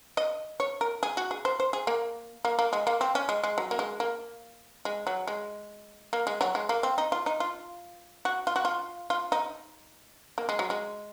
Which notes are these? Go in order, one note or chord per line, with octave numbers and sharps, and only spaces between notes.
D#5
C#5
A#4
G#4
F#4
G#4
C5
C5
G#4
A#3
A#3
A#3
G#3
A#3
C4
C#4
G#3
G#3
F#3
A#3
G#3
A#3
G#3
F#3
G#3
A#3
G#3
F#3
G#3
A#3
C4
D#4
F4
D#4
F4
F#4
F4
F#4
F4
F4
D#4
A#3
G#3
F#3
G#3